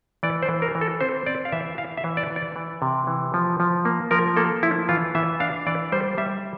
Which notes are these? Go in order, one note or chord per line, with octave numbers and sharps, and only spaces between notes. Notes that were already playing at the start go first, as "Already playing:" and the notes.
E3 D5
C5
E3
A#4
E3
A4
C4 C5
C4 D5
F5
E3 E5
E3 F5
E5
E3
D5
E3
D5
E3
C3
E3
F3
F3
A#3
F3 A#4
A#3 A4
F3 E4
E3 F4
E3 E5
D4 F5
E3 D5
G3 C5
G3 E5